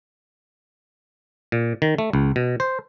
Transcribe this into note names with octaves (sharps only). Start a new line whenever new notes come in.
A#2
D#3
A3
C#2
B2
C5